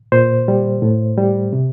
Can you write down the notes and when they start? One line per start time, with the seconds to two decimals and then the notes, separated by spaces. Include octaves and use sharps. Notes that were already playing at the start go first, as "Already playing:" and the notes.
0.12 A#2 C5
0.48 G3
0.82 A2
1.18 G3
1.53 C3